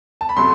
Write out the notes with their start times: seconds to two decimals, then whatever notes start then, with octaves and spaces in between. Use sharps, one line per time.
0.21 A5
0.29 B5
0.37 C3 F#3 A3 C6